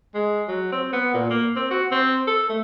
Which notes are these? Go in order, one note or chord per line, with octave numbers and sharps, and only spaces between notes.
G#3
F#3
C4
B3
A#2
A#3
C4
F#4
C4
A4
A3